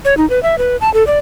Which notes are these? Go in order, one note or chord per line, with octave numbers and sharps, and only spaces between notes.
C#5
D#4
B4
E5
B4
A5
A4
D5